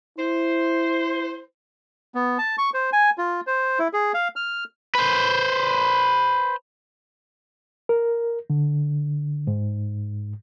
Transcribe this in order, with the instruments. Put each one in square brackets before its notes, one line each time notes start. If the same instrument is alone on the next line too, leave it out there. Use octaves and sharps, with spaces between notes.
[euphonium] E4 [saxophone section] C5
[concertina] B3
A5
C#6
C5
G#5
F4
C5
E4
G#4
F5
F6
[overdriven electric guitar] B4 C5
[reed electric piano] A#4
D3
G#2